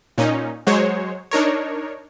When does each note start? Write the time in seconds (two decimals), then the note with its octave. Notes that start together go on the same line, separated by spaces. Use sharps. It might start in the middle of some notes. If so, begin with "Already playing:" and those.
0.18 A#2 C#4 D#4
0.67 F#3 G#3 C5 C#5
1.31 D4 D#4 A#4 C#5